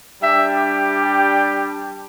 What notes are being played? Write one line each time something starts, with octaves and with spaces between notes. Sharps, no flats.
G3 D4 G4 E5
G5